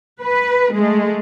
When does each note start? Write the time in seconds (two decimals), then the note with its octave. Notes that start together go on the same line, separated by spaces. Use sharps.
0.21 B4
0.73 G#3 A3